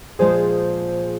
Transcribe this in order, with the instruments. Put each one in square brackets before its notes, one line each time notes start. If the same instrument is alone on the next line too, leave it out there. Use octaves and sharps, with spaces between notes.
[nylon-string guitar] A#2 F3 G#3 [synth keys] G#4 C5